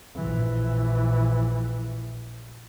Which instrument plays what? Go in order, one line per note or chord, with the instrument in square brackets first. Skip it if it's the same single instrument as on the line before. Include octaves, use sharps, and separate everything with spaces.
[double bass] A#1 E3